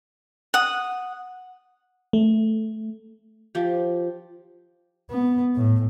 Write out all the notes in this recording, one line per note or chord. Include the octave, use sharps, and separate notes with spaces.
F#5 D#6
A3
F3 G4
B3
A2